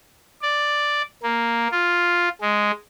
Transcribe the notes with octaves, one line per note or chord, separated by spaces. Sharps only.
D5
A#3
F4
G#3